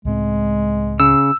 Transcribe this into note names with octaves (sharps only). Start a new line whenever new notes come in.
C#2 A2 G#3 C4
C#3 E6